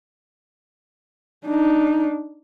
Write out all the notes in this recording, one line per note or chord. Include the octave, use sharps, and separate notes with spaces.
D4 D#4